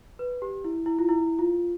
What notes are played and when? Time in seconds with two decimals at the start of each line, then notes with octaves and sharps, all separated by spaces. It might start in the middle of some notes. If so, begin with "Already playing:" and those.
0.19 B4
0.42 G4
0.64 E4
0.86 E4
0.99 F4
1.09 E4
1.39 F4